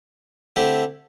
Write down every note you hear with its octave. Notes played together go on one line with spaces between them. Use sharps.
D3 A3 C4 E4 G4